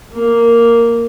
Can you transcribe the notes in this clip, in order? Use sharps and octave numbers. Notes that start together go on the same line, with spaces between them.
A#3